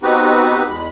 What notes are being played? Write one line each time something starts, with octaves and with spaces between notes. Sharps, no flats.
B3 C4 D#4 F#4 G4 B4
E2 G#3 B5